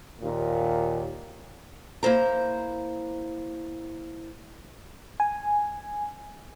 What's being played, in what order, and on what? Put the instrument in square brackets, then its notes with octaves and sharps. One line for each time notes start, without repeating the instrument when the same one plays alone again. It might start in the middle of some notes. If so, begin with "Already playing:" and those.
[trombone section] D#2 A#2
[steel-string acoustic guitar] A#3 E4 C5 A#5
[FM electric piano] G#5